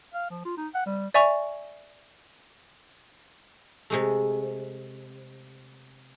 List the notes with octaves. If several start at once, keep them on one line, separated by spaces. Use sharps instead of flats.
F5
F3
F4
D#4
F#5
G3
D5 E5 G#5 C#6 F7
C3 G#3 A3